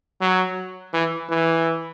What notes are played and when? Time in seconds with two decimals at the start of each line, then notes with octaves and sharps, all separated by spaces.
0.21 F#3
0.93 E3
1.29 E3